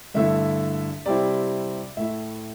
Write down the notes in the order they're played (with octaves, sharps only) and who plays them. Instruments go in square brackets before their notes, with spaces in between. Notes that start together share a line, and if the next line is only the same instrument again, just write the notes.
[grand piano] G2 D3 A3 E4 E5
C3 G3 C4 E4 D5
A2 A3 E4 E5